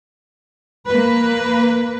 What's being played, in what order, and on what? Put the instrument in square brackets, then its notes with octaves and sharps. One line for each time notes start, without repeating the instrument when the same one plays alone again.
[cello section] A#3 B4